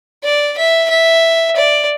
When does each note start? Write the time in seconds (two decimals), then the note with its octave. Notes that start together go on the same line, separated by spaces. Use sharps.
0.23 D5
0.57 E5
0.90 E5
1.56 D5